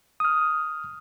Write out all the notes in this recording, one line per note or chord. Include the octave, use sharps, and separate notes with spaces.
D#6 F6